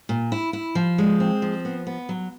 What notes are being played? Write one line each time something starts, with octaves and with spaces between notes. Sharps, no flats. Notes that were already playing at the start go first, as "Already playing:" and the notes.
A#2
E4
E4
F3
G#3
C4
F3
B3
B3
F#3